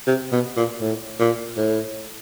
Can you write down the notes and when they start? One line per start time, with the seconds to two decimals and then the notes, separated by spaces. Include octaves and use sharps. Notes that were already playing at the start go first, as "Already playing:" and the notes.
0.07 C3
0.32 B2
0.57 A#2
0.81 A2
1.20 A#2
1.57 A2